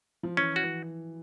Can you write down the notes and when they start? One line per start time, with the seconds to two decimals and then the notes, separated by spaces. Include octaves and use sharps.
0.23 F3
0.37 E3 C#4
0.56 F#4
0.63 E3